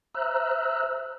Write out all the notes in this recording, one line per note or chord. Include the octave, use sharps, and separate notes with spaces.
C5 E5 A#5 E6 F#6